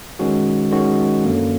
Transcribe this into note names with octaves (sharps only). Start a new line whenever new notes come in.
D#3 G#3 C#4 F#4
D#3 G#3 C#4 F#4
F#2 D3 F#3 A#3